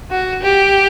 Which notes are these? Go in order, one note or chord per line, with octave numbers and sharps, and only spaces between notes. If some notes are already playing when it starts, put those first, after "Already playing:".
F#4
G4